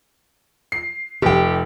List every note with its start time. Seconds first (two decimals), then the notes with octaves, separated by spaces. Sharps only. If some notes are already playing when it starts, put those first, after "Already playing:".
0.72 C7
1.22 F1 G4 G5